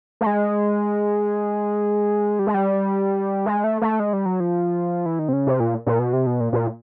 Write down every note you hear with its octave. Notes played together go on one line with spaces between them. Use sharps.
A3
G#3
G3
G#3
G3
G#3
A3
A3
G#3
G3
F#3
F3
E3
D#3
C3
C#3
C3
A#2
A#2
B2
C3
B2
A#2
A#2